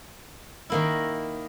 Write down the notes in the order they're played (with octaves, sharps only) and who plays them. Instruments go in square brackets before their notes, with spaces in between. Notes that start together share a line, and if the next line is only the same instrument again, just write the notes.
[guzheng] D#3 A#3 E4